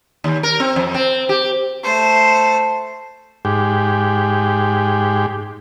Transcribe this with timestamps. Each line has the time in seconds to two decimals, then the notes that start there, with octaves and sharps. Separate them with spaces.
0.24 D#2
0.43 A#4
0.60 C4
0.76 F2
0.95 C4
1.29 G4
1.83 A3 C5
3.45 G#2 G4